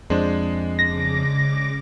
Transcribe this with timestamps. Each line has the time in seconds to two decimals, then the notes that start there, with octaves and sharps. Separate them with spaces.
0.10 F2 G#3 D4 C5
0.79 C#3 D6 A#6